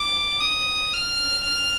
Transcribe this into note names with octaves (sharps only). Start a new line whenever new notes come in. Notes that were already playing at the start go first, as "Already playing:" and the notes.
Already playing: D6
D#6
F6
F6